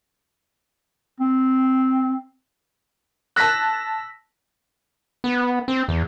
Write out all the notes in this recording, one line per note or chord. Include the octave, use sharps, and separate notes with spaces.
C4
A5 E6 F#6 A#6 B6
B3
C4
E2